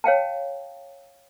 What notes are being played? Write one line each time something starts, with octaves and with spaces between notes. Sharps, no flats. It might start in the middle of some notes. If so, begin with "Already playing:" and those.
C#5 F5 G5 A5